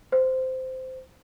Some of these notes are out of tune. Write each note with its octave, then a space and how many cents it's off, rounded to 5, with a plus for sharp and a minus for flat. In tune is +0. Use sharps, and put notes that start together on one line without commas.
C5 -15